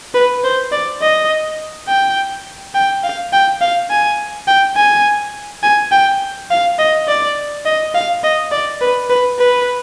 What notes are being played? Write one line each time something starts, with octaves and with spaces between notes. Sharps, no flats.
B4
C5
D5
D#5
G5
G5
F5
G5
F5
G#5
G5
G#5
G#5
G5
F5
D#5
D5
D#5
F5
D#5
D5
B4
B4
B4